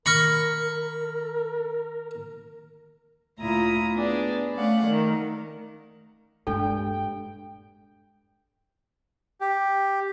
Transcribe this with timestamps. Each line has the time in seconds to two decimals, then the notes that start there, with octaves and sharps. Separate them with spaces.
0.06 D#3 A#4 B5 C#6 F6 A#6 C#7
3.39 D2 A#2 E4 F4 A#5 D#6
3.95 B3 D4 G#4 D5
4.54 A3 C#4 D5 F5 F#5
4.86 D#3 A3 A#4
6.47 G2 A#2 G#3 D4 A4 G5
9.41 G4